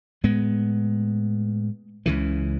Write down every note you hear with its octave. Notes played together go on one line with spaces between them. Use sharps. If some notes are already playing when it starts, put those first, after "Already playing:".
A2 G#3 B3
C#2 C#3 E3